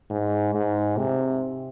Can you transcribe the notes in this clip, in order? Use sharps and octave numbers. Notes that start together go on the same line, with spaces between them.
G#2
G#2
C3